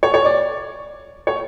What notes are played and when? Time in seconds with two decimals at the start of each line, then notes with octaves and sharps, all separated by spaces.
0.03 C#5
0.14 C#5
0.25 D5
1.27 C#5